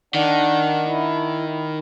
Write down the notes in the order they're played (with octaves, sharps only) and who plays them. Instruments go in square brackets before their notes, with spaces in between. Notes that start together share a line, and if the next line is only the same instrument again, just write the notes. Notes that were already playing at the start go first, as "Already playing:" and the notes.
[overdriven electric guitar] D#3 [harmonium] D4 D5 F#5
[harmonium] E4